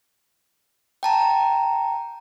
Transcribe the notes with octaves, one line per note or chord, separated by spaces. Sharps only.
G5 A5 A#5